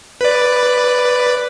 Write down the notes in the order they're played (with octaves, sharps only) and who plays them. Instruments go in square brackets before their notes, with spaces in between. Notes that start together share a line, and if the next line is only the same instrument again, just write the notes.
[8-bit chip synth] B4 D5